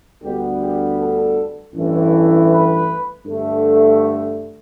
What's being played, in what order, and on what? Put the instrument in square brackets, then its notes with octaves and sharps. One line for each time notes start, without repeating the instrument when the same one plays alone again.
[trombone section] D2 D3 G3 B3 G4
G4
A4
A1 G2 E3 A3
B4
G2 D3 A3
A4